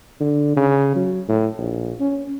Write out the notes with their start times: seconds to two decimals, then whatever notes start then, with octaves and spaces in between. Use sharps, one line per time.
0.20 D3
0.57 C#3
0.96 F#3
1.29 A2
1.58 A#1
2.00 C#4